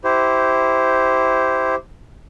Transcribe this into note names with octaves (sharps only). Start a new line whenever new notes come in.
E4 G4 C5